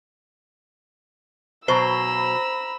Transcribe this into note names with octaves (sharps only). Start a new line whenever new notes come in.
B2 F#3 C5 A#5 B5 E6